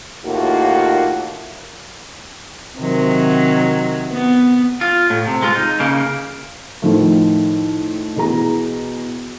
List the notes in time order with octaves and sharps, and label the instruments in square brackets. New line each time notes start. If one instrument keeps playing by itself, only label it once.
[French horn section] D#2 A2 D#3 A#3 F4 F#4
[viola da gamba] C3 D#3 F#3
B3
[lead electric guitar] F4
A2
C3
G#3 F4
D#4
C#3 A#3
[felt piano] A2 D#3 F3 A3
B2 E3 G#4 A#5